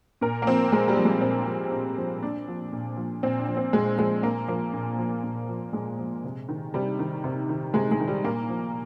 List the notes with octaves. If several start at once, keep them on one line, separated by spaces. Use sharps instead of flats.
A#2 A#4
A#3
F3 C4
A#2 G#3
G3
F3
G#3
A#2 C4
F3
A#2
F3
A#2 D4
F3
A#2
F3
A#2 C4
D4
F3
C4
A#2 G#3
F3 G#3
A#2 A#3
F3 A#3
A#2
F3
A#2
F3
A#2 G#3
F3
C3
D#3
C3 G3
D#3
C3
D#3
C3 G#3
G#3
D#3
G3
A#2 A#3
F3